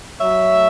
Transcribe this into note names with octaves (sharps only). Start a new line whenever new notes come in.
F#3 C#5 E5
A3